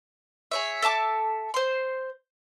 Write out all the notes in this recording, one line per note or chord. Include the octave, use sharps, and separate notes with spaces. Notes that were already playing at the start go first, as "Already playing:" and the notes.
G#4 C#5 E5
A4 E5 A5 D6
C5 C6